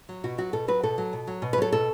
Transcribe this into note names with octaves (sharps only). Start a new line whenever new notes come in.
F#3
B2 F#4
F#3 F#4
B2 A4
F#3 B4
B2 A4
F#3
B2
F#3
B2
B4
F#3 A4
B2 A4